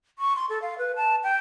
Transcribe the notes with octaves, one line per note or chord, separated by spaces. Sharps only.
C#6
C6
A4
F5
B4
A5
G5